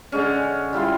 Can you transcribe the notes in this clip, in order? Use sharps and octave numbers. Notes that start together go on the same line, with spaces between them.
D3 G#3 C#4
G3 E4 F4 C6